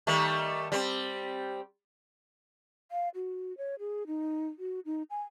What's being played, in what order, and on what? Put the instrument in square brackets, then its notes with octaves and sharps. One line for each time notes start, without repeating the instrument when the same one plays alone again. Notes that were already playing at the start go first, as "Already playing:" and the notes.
[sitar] D#3 G3 A3
G3 C4
[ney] F5
F#4
C#5
G#4
D#4
F#4
D#4
G#5